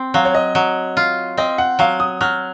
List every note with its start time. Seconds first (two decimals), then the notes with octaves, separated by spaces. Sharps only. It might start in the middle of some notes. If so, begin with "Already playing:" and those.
Already playing: C4
0.14 F#3 F5
0.25 C#5
0.35 D#5
0.55 F#3
0.97 F4
1.37 C4 D#5
1.58 F#5
1.79 F#3 F5
2.00 D#6
2.21 F#3 F6